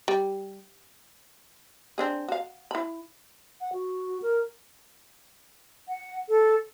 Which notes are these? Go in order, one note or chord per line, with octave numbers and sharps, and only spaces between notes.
G3
C4 D4 G#4
F#4 F5
E4 B5
F#5
F#4
A#4
F#5
A4